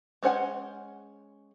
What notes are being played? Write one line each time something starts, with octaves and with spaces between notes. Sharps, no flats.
G#3 C#4 C5 F#5 G#5